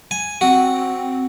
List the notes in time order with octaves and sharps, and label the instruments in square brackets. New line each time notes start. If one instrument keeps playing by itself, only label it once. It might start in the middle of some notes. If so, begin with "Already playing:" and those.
[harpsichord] G#5
[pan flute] C4 [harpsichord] F#4